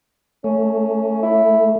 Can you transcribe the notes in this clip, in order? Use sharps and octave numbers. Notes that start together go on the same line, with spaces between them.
A3 C#4
E4